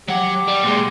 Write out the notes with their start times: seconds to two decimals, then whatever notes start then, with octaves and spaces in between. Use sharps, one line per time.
0.09 F#3 G4 F#5
0.48 G3
0.63 A#2 G#3